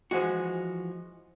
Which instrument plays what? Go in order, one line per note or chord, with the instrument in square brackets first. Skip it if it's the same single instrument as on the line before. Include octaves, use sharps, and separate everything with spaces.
[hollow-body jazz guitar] E3 F3 G#3 F#4